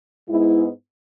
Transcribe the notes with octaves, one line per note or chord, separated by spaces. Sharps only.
G#2 G#3 B3 E4